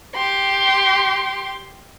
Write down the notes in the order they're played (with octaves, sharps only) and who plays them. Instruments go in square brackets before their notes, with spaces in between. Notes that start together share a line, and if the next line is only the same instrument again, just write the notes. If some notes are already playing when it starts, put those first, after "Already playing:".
[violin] G4 C6